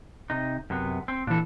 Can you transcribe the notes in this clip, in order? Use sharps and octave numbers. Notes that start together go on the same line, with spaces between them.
C3 D#4
F#2 C3 B3
C4
A#2 E3 D4 A4